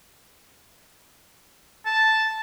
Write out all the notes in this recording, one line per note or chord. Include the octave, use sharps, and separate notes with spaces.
A5